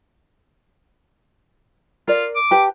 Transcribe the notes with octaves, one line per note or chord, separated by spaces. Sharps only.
F4 A#4 D5
D6
G4 B4 A5